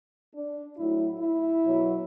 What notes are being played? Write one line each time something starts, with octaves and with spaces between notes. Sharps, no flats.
D4
A2 F#3 E4
E4
B2 F#3